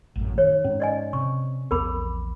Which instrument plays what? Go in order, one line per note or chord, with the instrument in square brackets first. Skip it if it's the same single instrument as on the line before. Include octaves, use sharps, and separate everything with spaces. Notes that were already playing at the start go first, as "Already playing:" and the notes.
[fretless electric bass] A1 F#2 A2
[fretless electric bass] D#3 [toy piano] C#5
[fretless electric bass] G#2 [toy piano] C#4
[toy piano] D5 D#5 G#5
[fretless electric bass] C3 [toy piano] C#6
[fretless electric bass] A#1 E2 B3 [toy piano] A#4 B5 D6